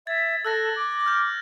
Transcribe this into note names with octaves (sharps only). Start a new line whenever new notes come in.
E5 G#6 A6
A4 E6 F#6 A#6
D6
F6 G6